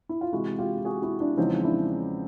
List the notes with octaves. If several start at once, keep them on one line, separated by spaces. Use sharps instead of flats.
E4
F4
C3 E3 G#3 E4 F#4
F4 G4
G4
F#4 G#4
E4 F#4
D4 E4
E2 C#3 F3 G#3 C4 C#4 D#4
D4 E4